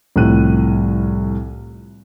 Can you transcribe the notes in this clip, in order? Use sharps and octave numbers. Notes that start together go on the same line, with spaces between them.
C2 A2 F3 F#6 D#7